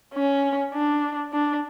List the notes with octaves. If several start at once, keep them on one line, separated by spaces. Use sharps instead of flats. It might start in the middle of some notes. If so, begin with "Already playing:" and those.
C#4
D4
D4